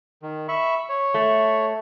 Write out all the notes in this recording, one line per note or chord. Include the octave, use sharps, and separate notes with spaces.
D#3
E5 B5 C#6
C#5
A3